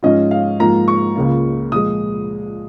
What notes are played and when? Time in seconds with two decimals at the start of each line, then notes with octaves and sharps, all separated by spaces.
0.03 G#2 F3 C#4 F4 D#5
0.31 F5
0.60 G#2 F3 A#3 F4 A#5
0.88 C#6
1.16 C#2 C#3 A#3 F4
1.72 A#2 F3 G#3 D#6